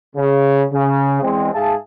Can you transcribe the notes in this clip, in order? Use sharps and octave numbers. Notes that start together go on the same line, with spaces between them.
C#3
C#3
E2 G#3 C4
G#2 G#4 E5 F5 A5